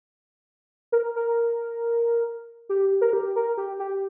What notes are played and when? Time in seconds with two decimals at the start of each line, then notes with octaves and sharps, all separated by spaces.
0.92 A#4
1.16 A#4
2.69 G4
3.01 A#4
3.13 G4
3.36 A#4
3.58 G4
3.79 G4